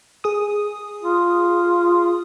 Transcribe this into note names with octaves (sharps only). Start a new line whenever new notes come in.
G#4 D#6
F4